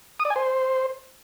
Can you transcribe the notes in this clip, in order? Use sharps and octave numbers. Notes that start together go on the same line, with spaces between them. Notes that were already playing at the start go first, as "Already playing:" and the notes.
D#6
D5
G#5
C5